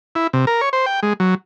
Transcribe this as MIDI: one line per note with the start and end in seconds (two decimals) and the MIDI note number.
0.15 0.27 64
0.33 0.45 48
0.47 0.61 70
0.61 0.69 73
0.73 0.86 72
0.86 1.00 79
1.03 1.13 56
1.20 1.35 54